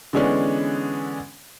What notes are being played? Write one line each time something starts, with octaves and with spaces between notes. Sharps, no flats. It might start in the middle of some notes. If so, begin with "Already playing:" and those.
D3 E3 G#3 B3 C#4 D4